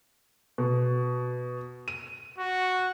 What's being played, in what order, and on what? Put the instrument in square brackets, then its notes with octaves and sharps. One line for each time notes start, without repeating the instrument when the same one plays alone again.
[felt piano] B2
D#7
[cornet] F#4